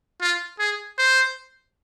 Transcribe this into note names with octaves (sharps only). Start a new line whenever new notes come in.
F4
G#4
C5